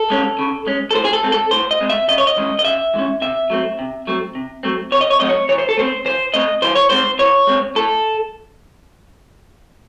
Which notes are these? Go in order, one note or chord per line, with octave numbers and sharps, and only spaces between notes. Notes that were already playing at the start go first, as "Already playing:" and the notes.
Already playing: A4
G#3 C#4
C#3
G#3 C#4
A4
A2 C5
G#4
A4
G#3 C4
A4
A2 C5
D#5
G#3 C4
E5
C#3 D#5
C#5
D#5
E3 G#3 C#4
D#5
C#3 E5
E3 G#3 C#4
C3 E5
F#3 A3 C4
C3
F#3 A3 C4
C3
F#3 A3 C4
C3 C#5
D#5
C#5
F#3 A3 C4 D#5
C#5
E3 C#5
C5
A4
A3 C4 C5
E3 C5
A3 C4 D#5
E3 C5
C#5
G#3 C4 C5
E3 C#5
G#3 C4
A2 A4